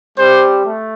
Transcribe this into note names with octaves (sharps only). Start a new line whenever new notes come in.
G3 C4 G4 C5
A3